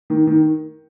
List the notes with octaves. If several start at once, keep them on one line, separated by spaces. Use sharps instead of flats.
D#3
D#3